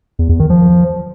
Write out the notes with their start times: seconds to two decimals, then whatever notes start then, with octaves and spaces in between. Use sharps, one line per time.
0.19 E2
0.29 E2
0.39 D#3
0.50 F3